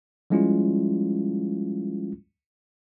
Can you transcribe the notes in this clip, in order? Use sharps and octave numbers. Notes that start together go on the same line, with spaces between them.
F3 G3 G#3 C#4 E4 F4